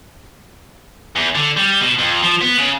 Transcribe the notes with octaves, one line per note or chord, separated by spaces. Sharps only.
E2
D3
G3
B2
F2
F3
B3
C#3